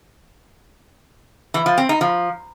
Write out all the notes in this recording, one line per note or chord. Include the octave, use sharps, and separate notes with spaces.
E3
F3
C4
D#4
F3